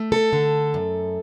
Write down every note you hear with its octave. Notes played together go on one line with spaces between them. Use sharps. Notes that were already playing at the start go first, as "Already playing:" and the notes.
Already playing: A3
A4
D3
F#2